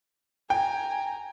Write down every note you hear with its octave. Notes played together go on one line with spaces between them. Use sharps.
G5 G#5 A#5